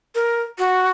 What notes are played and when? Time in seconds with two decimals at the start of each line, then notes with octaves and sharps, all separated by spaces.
0.15 A#4
0.58 F#4